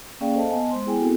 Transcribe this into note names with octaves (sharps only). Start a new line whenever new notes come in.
A#3 C#4 G#4 D5 F5 G5
A4 C5 D#5 F5 A5
B3 D#5 G#5 A5
G#3 C5 C6
B3 E4 G#4 G5 G#5
B3 C4 E4 F#4 G#4 A4